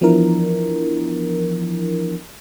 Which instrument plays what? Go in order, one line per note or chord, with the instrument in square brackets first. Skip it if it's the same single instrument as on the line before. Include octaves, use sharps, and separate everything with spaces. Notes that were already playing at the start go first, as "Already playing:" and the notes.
[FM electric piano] E3 F3 B3 D4 E4 A#4